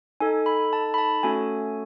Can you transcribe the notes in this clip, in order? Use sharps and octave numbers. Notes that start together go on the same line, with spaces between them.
D#4 A4 G#5
B5
A5
B5
A5
A3 C#4 F#4 A4 G#5